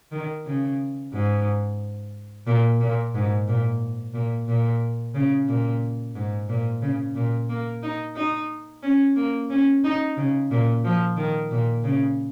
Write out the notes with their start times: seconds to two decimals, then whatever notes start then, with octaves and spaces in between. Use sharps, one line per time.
0.12 D#3
0.46 C#3
1.13 G#2
2.47 A#2
2.80 A#2
3.14 G#2
3.48 A#2
4.14 A#2
4.47 A#2
5.15 C#3
5.48 A#2
6.15 G#2
6.49 A#2
6.82 C#3
7.16 A#2
7.49 A#3
7.83 D#4
8.16 D#4
8.83 C#4
9.16 A#3
9.50 C#4
9.84 D#4
10.17 C#3
10.51 A#2
10.84 F3
11.17 D#3
11.51 A#2
11.84 C#3